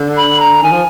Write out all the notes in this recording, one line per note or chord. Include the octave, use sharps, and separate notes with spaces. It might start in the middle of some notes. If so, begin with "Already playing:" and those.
Already playing: D3
B5
A#5
D#3 G#5
F3